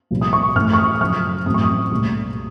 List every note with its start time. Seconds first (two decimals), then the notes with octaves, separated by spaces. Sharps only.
0.11 C2 A#2 F3
0.21 D#6
0.33 C#6
0.55 A1 A2 A3 F6
0.73 C#6
0.78 D#6
0.94 D#6
1.01 F#2 C#3 F3 A3 F6
1.46 A1 A2 F#3 C4 D#6
1.54 C#6
1.63 D#6
1.91 C2 A#2 A3